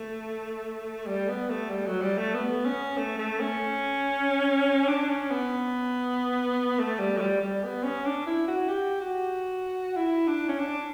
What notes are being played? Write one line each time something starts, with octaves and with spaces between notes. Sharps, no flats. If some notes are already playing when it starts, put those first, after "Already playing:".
Already playing: A3
G3
B3
A3
G3
F#3
G3
A3
B3
C#4
A3
A3
C#4
D4
C#4
B3
A3
G3
F#3
G3
G3
B3
C#4
D4
E4
F#4
G4
F#4
E4
D4
C#4
D4